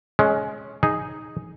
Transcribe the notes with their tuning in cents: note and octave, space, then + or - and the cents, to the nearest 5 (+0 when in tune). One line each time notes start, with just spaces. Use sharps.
G#3 +20 C#4 +5
D#4 +0 G#4 +0